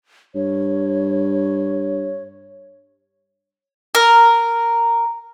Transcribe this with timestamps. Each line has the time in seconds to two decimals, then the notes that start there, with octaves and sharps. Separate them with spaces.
0.35 G2 C#5
3.95 A#4